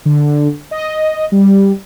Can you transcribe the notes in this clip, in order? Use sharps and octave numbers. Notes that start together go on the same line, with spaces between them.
D3
D#5
G3